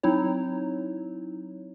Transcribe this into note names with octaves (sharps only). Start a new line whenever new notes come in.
F#3 C4 D#4 E4 C#5